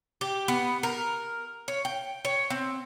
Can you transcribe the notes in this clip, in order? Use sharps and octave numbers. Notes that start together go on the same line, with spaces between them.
G4
B3
A#4
C#5
G5
C#5
C4